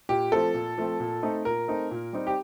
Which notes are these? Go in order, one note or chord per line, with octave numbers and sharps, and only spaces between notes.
A#2 G4
F3 A3 C4 A4
A#2
F3 A3 C4
A#2
A3 C4 D#4
A#2 A#4
A3 C4 D#4
A#2
G3 C4 D#4
G4